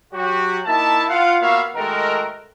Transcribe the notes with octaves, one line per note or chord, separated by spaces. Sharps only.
F#3 F#4 G4
A#3 D#4 E4 E5 A5
F4 F5 F#5
A#3 B3 F#4 C#5 E5 F5
D#3 G#3 A3 F#4 A4 A#4